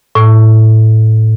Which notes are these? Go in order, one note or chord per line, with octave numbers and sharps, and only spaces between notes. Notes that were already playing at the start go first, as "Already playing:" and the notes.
A2